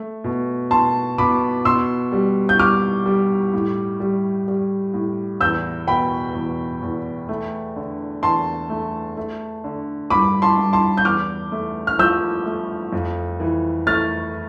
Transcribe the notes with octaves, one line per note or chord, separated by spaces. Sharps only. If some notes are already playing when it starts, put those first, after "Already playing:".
Already playing: A3
B2
B2 A5 C6
B2 B5 D6
B2 C6 E6
G3
G6
G3 D6 F6
G3
A2
G3
G3
A2
E2 E6 G6
B2 G5 B5
E2
E2
A3
D3
E2 A5 C6
A3
A3
D3
G2 B5 D6
A5 C6
G2
A5 C6
G6
E2 D6 F6
A3
F6
F3 E6 G6
A3
F2
E3
A3 F6 A6